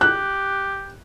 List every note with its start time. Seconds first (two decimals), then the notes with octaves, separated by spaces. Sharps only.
0.01 G4 F#6